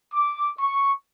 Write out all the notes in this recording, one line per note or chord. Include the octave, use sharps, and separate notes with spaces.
D6
C#6